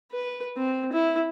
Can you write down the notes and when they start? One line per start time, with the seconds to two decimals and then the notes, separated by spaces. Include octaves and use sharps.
0.12 B4
0.57 C4
0.93 E4